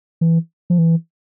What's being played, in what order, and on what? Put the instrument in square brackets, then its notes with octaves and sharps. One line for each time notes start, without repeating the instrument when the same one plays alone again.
[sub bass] E3
F3
E3